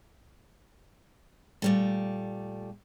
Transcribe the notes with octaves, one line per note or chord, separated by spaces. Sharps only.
A#2 G3 A3